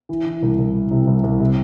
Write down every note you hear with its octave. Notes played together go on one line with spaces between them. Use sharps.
E3
E3
C2
C2
E3
C3
C2
C2
C3